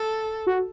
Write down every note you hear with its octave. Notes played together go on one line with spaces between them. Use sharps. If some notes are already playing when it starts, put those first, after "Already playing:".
Already playing: A4
F#4